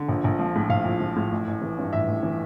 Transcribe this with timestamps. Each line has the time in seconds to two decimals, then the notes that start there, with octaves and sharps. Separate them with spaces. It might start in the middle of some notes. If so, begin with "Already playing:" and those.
Already playing: D3
0.09 A#1
0.24 A#1
0.39 F3
0.55 A2
0.70 A#1 F5
0.85 A#1
1.00 F3
1.16 A2
1.32 A1
1.47 A1
1.62 E3
1.78 G2
1.93 A1 E5
2.08 A1
2.23 E3